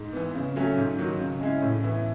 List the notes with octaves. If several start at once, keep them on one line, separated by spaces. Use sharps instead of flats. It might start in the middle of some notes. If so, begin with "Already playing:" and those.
Already playing: G#2
E3 B3
C#3
F#3 A3 C#4
G#2
D#3 F#3
C#3
G#3 C#4 E4
A2
E3 B3 E4